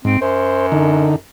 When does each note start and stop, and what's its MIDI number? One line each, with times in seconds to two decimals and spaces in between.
0.05 0.17 44
0.05 0.20 60
0.22 1.18 42
0.22 0.66 72
0.72 1.16 50
0.72 1.16 63